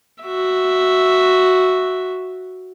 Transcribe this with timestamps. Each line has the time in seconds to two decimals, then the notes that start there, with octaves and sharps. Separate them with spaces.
0.23 F#4 E5